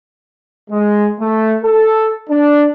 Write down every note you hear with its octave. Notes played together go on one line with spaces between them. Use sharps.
G#3
A3
A4
D4